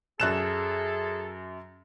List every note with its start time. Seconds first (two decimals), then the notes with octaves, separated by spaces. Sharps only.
0.20 F#2 G#4 A4 F#6 E7